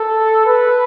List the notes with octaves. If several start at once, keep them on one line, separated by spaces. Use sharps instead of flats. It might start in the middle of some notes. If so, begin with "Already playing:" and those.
Already playing: A4
B4